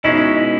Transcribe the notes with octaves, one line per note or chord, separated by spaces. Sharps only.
B2 G#3 C#4 D#4 E4